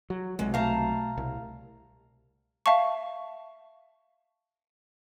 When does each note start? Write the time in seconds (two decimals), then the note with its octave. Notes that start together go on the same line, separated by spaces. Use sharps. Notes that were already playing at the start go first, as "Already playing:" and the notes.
0.10 F#3
0.39 B1 C3 F#3 G#3
0.54 B2 A3 F5 A5 A#5
1.17 C2
2.66 E5 F5 A5 C#6